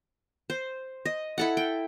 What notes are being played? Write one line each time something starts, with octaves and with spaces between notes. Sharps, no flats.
C5
D#5
E4 A4 F#5
G5